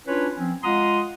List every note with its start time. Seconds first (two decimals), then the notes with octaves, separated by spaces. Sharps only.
0.07 C#4 D4 E4 F4 B4 C#5
0.37 F3 C4 C#4
0.63 G#3 F4 F#5 A#5 C6 D#6